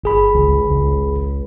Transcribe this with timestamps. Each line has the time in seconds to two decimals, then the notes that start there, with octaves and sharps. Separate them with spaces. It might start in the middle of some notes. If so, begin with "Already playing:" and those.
0.04 G1 G#4 B5
0.34 C#2
0.70 C#2